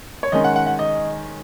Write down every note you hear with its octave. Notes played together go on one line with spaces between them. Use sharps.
C#5
D#3 G#3 C#4 D#5
F#5
F#5
F#5
D#5